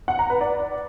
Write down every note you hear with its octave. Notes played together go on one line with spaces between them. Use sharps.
F#5
A#5
B4
D5